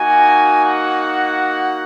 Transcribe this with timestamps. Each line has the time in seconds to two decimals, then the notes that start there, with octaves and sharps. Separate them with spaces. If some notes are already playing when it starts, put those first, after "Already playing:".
Already playing: A#3 D#4 F#4 G#5
0.64 F#5